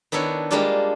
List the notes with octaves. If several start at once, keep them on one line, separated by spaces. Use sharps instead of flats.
D#3 B3 D4 E4 C#5
G3 G#3 A#3 D4 F4 G4